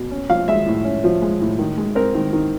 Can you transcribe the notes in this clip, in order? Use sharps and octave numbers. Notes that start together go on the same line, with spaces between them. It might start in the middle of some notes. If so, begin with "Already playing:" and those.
Already playing: B2
C#4
F3 F5
G#3 E5
A2
C#4
F3
G#3
A2
D#3
G#3
C4 A#4
D#3
D#3